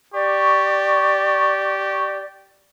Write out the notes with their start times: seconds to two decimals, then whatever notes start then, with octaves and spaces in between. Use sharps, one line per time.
0.14 G4 D5 C#6